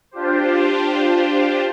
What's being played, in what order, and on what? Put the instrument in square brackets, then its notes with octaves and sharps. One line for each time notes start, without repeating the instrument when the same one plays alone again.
[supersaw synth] D4 F4 G4 C5